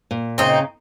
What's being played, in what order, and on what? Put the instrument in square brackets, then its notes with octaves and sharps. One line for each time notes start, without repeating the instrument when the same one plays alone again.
[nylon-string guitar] A#2
[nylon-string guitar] C#3 [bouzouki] C4 D#4